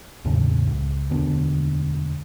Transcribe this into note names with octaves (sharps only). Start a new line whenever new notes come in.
B1 E2 A2 C#3
C#2
E1 D2 D3 B3